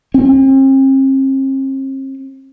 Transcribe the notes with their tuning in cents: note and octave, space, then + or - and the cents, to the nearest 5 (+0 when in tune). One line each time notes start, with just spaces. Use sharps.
C4 +45